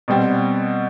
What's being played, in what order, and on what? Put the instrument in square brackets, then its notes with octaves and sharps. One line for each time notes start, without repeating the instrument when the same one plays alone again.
[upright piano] B2 G3 C4 G4